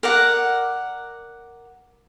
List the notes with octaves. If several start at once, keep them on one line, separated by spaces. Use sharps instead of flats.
A#4 D5 F#5